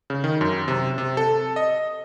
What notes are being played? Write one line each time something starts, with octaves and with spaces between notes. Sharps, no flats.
C#3
D#3
F#2
C3
C3
A4
D#5